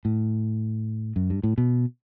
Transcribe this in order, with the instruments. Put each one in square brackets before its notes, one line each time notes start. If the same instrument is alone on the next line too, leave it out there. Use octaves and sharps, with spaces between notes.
[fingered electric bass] A2
F#2
G2
A2
B2